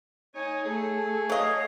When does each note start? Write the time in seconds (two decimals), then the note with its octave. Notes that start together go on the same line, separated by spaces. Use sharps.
0.35 D#4 C#5 G#5
0.65 A3 G#4 A4
1.30 F#3 C#5 D#5 F5